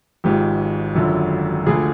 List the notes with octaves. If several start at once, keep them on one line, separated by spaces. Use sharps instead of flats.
G#1 G#2 F3 G4
G#1 F#2 D3 F3
D2 D3 F3 G#4